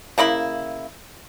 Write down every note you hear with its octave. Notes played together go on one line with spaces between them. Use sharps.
C#3 A#3 E4 B5